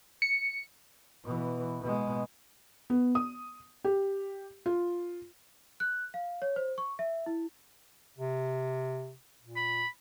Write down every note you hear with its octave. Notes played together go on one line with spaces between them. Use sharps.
C#7
B2 E3
B2 G#3
B3
D#6
G4
F4
F#6
F5
C#5
C5
C#6
E5
E4
C3
A#2
B5